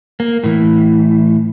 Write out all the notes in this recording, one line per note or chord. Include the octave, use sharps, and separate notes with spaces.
A#3
A2 E3